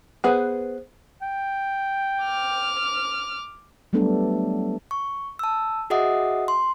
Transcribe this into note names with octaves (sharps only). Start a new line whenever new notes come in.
B3 G#4 B4 C5
G5
D6 F6
F#3 G3 A3 B3 D4 A4
C#6
A5 E6
F#4 G#4 D#5 E5 F#5 D#6
C6